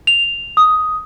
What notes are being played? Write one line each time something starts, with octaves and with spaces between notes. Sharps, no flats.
F7
D#6